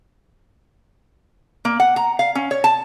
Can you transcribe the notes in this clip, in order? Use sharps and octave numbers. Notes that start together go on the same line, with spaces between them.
A#3
F#5
A#5
F5
C#4
C#5
A5